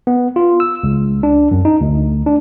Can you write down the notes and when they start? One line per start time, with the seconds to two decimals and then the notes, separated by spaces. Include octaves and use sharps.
0.07 B3
0.36 F4
0.60 E6
0.83 C#2
1.23 D4
1.51 F#2
1.65 D#4
1.81 D2
2.26 D4